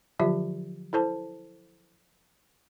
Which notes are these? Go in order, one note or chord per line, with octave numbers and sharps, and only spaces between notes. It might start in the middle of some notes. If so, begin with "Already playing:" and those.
D3 F3 F#3 F4 G4 E5
E4 A4 C5 A5